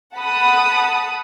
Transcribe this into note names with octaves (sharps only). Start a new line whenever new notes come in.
F#5 A5 B5 D#6